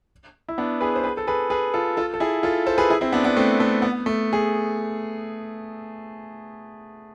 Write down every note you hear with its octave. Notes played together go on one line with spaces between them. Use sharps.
E4
B3 D4
G#4 B4
C5
G#4 B4
A4
G#4 B4
G#4 B4
F4 A4
F4 A4
A4
E4 G#4
F4 A4
A4 C5
G#4 B4
E4 G#4
C4 E4
B3 D4
B3 D4
A3 C4
A3
B3
A3
G#4